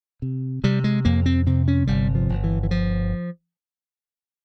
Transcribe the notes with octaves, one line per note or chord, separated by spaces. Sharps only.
C3
C3 G3
G#3
F2 A#3
C4
C3 C4
C#4
G1 G3
F3
G1
E3
E3
F3